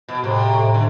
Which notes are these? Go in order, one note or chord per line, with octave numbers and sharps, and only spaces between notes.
B2
A2 C3
A2
D3